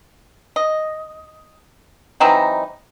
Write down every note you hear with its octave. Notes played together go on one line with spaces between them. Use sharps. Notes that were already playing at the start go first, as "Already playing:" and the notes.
D#5
E3 F#3 C4 D#4